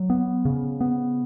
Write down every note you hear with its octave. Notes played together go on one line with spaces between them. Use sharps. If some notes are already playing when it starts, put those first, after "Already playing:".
Already playing: F#3
B3
C#3
B3